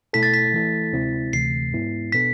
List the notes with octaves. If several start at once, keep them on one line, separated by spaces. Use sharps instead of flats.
B2 A3 E4 A4 B6
A6
B6
E3 A3 E4 A4
D2 C3 G#3 C4 E4
D2 C3 E3 A3 C7
G#2 G#3 B3 E4
B2 B3 D4 A4 B6